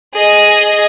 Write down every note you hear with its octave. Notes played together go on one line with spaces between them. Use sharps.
G#4 D#5